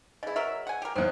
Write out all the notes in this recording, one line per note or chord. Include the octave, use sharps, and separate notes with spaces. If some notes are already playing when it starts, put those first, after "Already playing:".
C#3 E4 G#4 D#5
F#3 A#4 E5
F#5 G#5
G4 A#4
G#1 E2 C4 C5 C#5